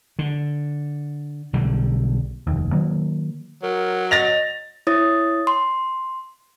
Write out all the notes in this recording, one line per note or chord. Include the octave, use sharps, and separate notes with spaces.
D3
B1 D3 G3
F1 D#2
D#3 F#3 A#3
F#3 A#4
D#5 A6 A#6 F7
E4 C#5 D#6 A6
C6